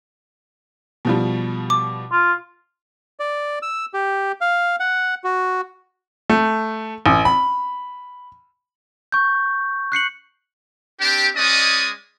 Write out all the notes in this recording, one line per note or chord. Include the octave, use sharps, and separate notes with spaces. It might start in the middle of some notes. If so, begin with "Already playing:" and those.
B2 F3 G3
D6
F4
D5
E6
G4
F5
F#5
F#4
A3
A1
B5
C#6 G6
F#6 C7 C#7 F#7
C4 D4 G4
G#3 C#4 D5 D#5 D#6